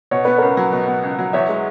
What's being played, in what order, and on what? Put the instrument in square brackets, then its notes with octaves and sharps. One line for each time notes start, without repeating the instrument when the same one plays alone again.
[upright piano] B2 [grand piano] C#5
[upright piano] B3 [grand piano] B4
[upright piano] C#2 [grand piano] A#4 C#5
[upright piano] F#3
B2
B3
C#2
F#3
[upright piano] E2 [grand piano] C#5 E5
[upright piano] G#3